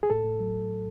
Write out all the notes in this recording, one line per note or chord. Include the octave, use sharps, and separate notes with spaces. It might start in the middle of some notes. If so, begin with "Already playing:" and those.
G#4
A2 A4
A2
F#3